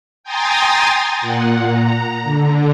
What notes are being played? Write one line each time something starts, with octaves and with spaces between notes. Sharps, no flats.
G5 G#5 A#5 C6 D#6 A6
A#2 F#5
A#5
D3